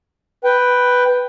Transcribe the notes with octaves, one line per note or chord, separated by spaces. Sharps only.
B4 G5